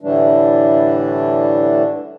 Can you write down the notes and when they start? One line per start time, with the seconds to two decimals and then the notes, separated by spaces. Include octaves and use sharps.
0.01 A2 D3 E3 G3 A3 D4